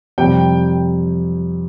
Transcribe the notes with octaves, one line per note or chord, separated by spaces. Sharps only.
F2 C3 G3 G5